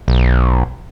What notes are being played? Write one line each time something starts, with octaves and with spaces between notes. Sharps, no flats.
B1